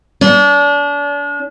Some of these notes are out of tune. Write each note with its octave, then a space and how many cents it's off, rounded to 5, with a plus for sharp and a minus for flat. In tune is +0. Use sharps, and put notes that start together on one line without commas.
D4 -35